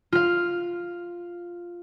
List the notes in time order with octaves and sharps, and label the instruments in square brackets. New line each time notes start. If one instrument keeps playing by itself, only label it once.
[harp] F4 F5